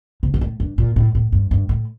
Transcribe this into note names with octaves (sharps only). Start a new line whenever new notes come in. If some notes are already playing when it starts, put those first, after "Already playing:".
C3
A#2
A2
G2
A#2
A2
A2
G2
G2
A2